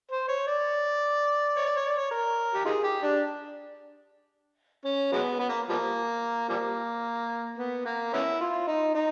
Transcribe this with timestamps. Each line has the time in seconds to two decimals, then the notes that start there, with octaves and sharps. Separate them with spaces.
0.11 C5
0.28 C#5
0.47 D5
1.56 C#5
1.66 D5
1.76 C#5
1.86 D5
1.96 C#5
2.11 A#4
2.54 G4
2.65 D#4 F4 G#4
2.84 G4
3.03 D4
4.84 C#4
5.12 F#3 G#3 B3
5.39 B3
5.49 A#3
5.69 F3 G3 A#3
6.49 F3 G3 A#3
7.58 B3
7.85 A#3
8.13 B3 C#4 E4
8.40 F4
8.67 D#4
8.95 D#4